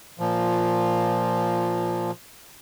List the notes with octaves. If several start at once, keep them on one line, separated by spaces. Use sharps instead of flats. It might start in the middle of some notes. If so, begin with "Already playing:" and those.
A#2 F3